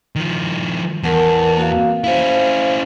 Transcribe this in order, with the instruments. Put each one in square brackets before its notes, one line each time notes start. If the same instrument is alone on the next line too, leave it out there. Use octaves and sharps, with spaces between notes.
[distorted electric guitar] D#3 F3
[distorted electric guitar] E2 [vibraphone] A#4 F#5 A5
[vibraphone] A#3 F#4 F5
[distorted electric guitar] C#4 E4 [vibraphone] C5 F5